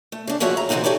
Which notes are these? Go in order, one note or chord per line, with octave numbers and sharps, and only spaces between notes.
A3
C#3 D4
D#2 F3 F#4 G#4 C#5 E5
A#5
C#3 E3 G#3 C4 D#4 F#4
C#4 E4 G4 A4 C#5 D5